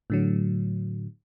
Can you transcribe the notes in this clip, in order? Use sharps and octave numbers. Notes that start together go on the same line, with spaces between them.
A2 D3 F#3